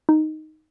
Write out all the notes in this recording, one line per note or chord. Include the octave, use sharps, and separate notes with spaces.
D#4